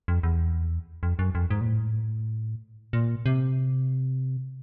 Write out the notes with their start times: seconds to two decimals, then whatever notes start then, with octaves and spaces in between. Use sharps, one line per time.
0.08 F2
0.23 E2
1.03 F2
1.19 F#2
1.35 F2
1.51 G#2
1.61 A#2
1.66 A2
2.93 A#2
3.26 C3